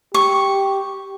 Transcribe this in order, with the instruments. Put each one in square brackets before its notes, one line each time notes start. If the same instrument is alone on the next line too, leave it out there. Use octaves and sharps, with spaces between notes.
[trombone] G4 [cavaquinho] C#6